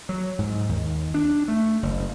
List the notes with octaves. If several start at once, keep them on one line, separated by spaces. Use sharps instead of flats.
F#3
G#2
D#2
D4
A3
F#1